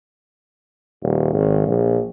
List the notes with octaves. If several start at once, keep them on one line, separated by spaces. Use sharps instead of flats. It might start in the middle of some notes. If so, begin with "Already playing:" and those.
D#1
G#1
A#1